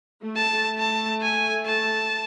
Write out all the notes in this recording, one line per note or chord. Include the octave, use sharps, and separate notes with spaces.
A3
A5
A3
A5
G#5
A5